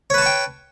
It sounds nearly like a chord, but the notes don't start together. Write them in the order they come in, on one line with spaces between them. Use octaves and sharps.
C#5 B4 A5 C#6 G5